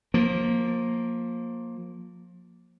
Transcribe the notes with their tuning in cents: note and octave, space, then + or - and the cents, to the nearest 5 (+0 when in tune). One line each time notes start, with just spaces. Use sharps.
F3 +25 A#3 +0